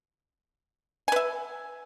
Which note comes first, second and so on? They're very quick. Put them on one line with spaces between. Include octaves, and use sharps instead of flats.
G#5 B4 E5